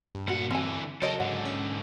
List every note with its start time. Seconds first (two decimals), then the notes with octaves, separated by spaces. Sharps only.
0.15 G2
0.28 A#2 A3 F#4 F#5
0.51 D3 E3 C4 G#5
1.02 C#3 F#3 A4 A#4 C5 C#5 D#5
1.20 G#2 D3 F#5
1.45 C#4